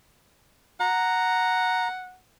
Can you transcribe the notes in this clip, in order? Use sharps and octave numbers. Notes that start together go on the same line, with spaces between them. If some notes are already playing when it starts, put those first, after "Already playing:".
F#5 A#5